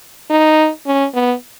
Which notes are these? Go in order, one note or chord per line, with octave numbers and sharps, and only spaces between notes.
D#4
C#4
B3